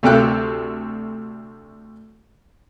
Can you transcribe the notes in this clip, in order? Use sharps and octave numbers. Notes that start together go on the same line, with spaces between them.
D2 C3 A4 G5 F#6